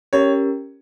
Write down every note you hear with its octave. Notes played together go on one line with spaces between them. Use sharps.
C#4 G4 A#4 C#5